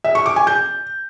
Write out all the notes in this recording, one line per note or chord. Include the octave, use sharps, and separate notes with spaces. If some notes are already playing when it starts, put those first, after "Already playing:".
E5
C#6
D6
G#5
G6